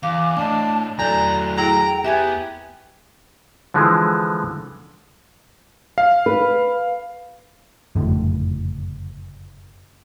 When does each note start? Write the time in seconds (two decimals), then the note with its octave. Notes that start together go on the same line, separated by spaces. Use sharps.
0.03 E2 F5 D6
0.37 A2 D4 D#5 A5 D6
0.99 E2 F#3 A3 A4 D5 A#5 G6
1.57 E4 G#4 G5 A#5
2.05 B3 G4 E5 G#5 G#6
3.74 D3 E3 F3 G#3
5.98 F5
6.26 B4
7.95 F#1 F2 A2 D3